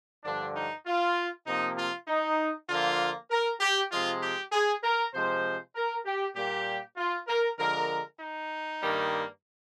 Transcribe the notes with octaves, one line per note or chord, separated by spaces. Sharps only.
G2 D3 F3 D4
D#4
F4
C3 F3 A#3 D#4
F4
D#4
D3 F3 A#3 F4
A#4
G4
C3 F3 G#3 F4
G4
G#4
A#4
C3 F3 G#3 C5
A#4
G4
A#2 G3 A#3 G4
F4
A#4
D3 F3 G#3 A#4
D#4
G2 D#3 G3 A#3